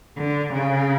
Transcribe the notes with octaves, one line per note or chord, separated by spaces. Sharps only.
D3
C#3